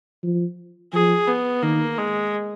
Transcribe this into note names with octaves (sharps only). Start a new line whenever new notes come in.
F3
F3 G#4
B3
D#3 A#3
G#3